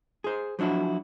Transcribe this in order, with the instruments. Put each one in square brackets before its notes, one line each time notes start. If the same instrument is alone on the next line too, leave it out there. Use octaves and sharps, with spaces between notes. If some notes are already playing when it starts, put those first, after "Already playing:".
[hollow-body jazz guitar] G#4 C5
F3 F#3 D4 E4 F#4